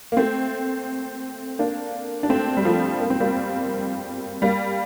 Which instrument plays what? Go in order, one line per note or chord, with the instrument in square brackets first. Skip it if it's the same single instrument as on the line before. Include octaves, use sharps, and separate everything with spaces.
[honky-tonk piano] A#3
A3 C4
A#3 D4
D4
A3 C4
G3
F3 A3
A#3
C4
G3 A#3
G3 A#3